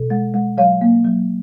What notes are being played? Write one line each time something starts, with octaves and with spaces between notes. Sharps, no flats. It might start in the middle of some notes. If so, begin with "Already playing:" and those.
Already playing: B2
G#3
G#3
F#3 C#5 F5
A#3
F#3